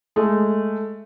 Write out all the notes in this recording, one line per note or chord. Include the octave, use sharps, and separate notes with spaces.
G#3 A3